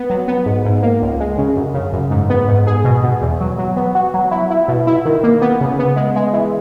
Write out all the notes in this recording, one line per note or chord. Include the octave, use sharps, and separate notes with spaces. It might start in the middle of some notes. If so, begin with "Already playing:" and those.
Already playing: B3
F#3
B3
G#2
G#2
A#3
C#2
G#3
C#3
F#2
C#3
F#2
G#2
B3
G#2
G#4
B2
B2
E2
F#3
F#3
B3
F#4
F#3
E4
E4
B2
E4
D#3
A#3
B3
C#3
B3
G#3
G#3
E3